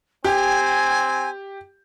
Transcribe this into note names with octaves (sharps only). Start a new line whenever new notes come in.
C4 G4 G#5